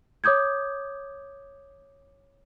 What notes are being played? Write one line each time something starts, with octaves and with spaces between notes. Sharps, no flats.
C#5 D6 D#6 G6 G#6